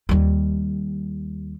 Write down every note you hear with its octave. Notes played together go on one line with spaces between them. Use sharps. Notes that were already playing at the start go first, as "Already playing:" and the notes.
D#2 G3